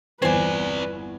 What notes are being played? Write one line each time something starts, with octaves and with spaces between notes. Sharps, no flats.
G1 E2 C4 B4 C5 D5 G#5 G#6